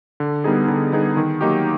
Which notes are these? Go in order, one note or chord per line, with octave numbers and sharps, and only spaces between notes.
D3
G3 B3 D#4 G#4
D3
G3 B3 D#4 G#4
D#3
F#3 A#3 D#4 G4